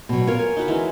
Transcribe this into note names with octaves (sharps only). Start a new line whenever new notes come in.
B2 F#3
F4 A#4 C#5
G#5
D#4 F#4 B5
E3 G#3 C#4